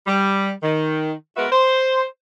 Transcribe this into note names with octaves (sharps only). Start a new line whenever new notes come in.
G3
D#3
G#3 B3 F#4 A#4 B4 E5
C5